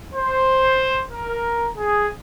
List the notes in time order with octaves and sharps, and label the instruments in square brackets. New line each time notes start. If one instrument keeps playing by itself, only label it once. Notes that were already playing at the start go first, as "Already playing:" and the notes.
[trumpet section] C5
A#4
G#4